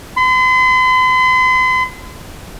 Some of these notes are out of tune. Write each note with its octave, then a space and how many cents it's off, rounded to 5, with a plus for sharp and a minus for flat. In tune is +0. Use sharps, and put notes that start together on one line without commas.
C6 -45